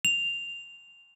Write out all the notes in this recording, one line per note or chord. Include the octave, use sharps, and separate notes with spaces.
F7